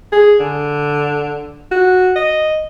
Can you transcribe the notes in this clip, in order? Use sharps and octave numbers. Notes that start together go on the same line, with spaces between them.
G#4
D3
F#4
D#5